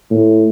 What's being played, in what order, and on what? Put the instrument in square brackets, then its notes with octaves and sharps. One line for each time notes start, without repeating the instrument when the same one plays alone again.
[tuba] A2